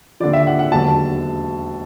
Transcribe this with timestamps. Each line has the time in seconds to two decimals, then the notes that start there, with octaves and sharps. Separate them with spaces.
0.20 D#2 D3 F3 D5
0.33 E5
0.47 F#5
0.59 F#5
0.71 E1 D#2 D3 F#3 A5